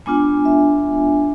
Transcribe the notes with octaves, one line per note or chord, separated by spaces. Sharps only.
G#3 B3 D4 F4 G#5
E5